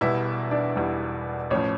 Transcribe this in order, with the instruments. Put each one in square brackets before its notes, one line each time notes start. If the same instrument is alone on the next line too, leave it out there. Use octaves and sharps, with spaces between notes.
[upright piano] E1 E2 B2 G3 E4 E5
D4 D5
E1 E2 B2 G3
A1 A2 F3 C#4 C#5